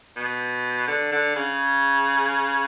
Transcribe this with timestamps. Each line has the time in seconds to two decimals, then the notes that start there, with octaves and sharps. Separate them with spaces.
0.17 B2
0.87 D3
1.12 D3
1.36 C#3